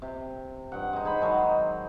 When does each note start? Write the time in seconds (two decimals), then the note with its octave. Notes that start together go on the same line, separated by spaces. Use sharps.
0.02 C3
0.72 G2 F#5
0.93 G#3 D#4
1.05 G#4 C5 F#5 B5
1.21 D#3 F#3 G#3 A5